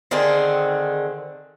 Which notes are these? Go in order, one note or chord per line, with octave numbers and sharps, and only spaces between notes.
D3 D#3 C4 G#4